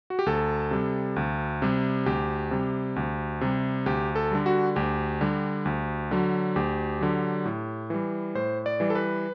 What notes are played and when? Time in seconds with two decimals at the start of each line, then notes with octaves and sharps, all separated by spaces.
0.10 F#4
0.19 G4
0.26 D2 A4
0.71 C3 G3
1.16 D2
1.62 C3 G3
2.06 D2 G4
2.51 C3 G3
2.96 D2
3.41 C3 G3
3.86 D2 G4
4.15 A4
4.31 D3 G3
4.46 F#4
4.76 D2 G4
5.21 D3 G3
5.65 D2
6.11 D3 F#3
6.56 D2 G4
7.01 D3 F#3
7.45 A2
7.90 E3 G3
8.35 A2 C5
8.66 D5
8.80 E3 G3
8.90 A4
8.95 B4